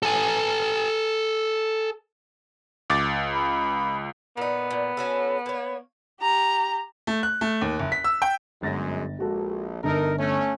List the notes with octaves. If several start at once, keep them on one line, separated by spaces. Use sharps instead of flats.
A4 G#5
C#2 D6 A6
B5
A#2 B3 D#4
A#2
C#4 F#4 A4
A#3 C#5
G4 A#5
A3
F#6
A3
D#2
F#1
B6
E6
G5
G1 F#2 G#3 A6 A#6
A#1 G#3 F#4 A4
G1 D3 D#4 A4 A#4
A3 C#4